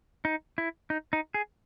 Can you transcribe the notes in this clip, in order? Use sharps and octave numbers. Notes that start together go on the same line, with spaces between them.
D#4
E4
D#4
D#4
G#4